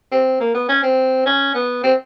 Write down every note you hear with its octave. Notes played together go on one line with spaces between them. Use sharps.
C4
A#3
B3
C#4
C4
C#4
B3
C4